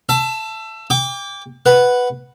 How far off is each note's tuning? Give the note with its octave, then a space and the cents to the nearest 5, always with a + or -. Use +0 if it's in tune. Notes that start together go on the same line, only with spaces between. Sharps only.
E5 +25 A5 +0
G5 +30 D6 -15
B4 +0 F#5 +0